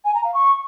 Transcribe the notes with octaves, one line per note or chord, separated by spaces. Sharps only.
G#5
A#5
F5
C#6